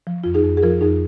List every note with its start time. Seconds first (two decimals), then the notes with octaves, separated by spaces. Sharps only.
0.07 F3
0.24 F2 F4
0.34 D#4 G#4
0.44 F2
0.57 G#4
0.63 F3 F4 A#4
0.81 F2 D#4 G#4